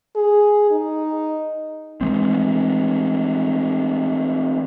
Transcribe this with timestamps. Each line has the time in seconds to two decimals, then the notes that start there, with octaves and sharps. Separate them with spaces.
0.16 G#4
0.71 D#4
2.01 E3 G#3 C4